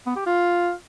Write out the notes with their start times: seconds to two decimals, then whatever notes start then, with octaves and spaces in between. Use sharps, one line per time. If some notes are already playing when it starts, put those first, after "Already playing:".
0.06 B3
0.16 G4
0.26 F4